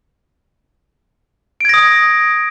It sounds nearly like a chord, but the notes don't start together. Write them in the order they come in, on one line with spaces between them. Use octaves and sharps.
D7 G#6 A#6 D#6